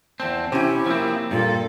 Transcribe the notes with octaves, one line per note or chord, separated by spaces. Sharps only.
E2 C4 A5
C3 C#4 E4 G4
F3 A#3 C4
G2 A#2 F4 A4